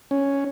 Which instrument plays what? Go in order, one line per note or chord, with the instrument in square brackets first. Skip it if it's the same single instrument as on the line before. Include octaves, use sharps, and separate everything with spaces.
[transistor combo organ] C#4